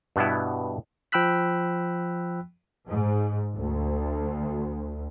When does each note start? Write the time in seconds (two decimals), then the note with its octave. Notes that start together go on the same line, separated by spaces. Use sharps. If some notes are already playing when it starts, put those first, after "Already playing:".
0.16 G2 B2 B3 E4
1.12 F3 G5 B5 E6 F#6 B6
2.88 G#2
3.55 D2